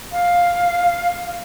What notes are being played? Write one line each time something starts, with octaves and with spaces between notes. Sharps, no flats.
F5